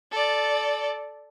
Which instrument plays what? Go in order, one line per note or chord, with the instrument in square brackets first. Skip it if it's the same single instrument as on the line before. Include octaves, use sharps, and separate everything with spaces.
[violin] A4 D5